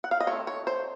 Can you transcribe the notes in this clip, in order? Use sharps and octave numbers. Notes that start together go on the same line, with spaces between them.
F#5
F5
D#5
D#3 A3 C4 C#5
C#5
C5